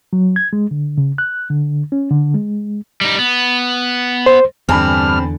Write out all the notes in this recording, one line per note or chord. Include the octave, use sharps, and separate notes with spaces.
F#3
G#6
G#3
D3
C#3
F#6
D3
C#4
D3
G#3
G3 D#4
B3
C5
E2 G2 D3 C4 G#5 A5 B5 F6